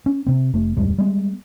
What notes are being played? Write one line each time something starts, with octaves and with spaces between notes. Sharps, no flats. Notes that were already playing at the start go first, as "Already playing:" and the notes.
C#4
C3 C4
F1 A3
D1 F2 G3 G#3
G3 G#3 B3